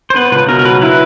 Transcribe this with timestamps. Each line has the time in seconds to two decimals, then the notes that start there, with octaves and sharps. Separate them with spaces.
0.10 C5
0.15 B3 B4
0.32 C#2 B4
0.48 B2 A#4
0.59 A#4
0.65 F#3 B4
0.81 E4 B4